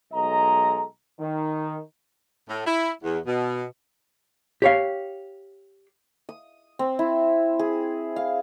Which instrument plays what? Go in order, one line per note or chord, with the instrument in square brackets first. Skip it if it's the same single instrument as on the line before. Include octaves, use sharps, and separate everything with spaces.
[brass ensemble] B1 G#3 A4 D#5 A#5
D#3
[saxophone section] A2
E4
E2
B2
[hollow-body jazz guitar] G4 C#5 F5
[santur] D#6
C4
E4
G#4
F5